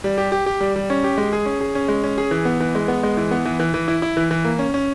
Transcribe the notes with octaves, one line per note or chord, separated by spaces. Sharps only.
G3
G4
G4
G4
G3
G3
C#4
G4
G#3
G#4
C#4
G#4
C#4
G#3
C#4
G#4
E3
B3
E3
G#3
B3
G#3
E3
B3
E3
E3
E3
E4
E4
E3
E3
A#3
C#4
C#4